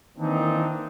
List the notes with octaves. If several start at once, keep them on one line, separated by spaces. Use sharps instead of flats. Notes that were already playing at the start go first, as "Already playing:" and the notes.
D#3 E3 A#3 C4 D4 D#4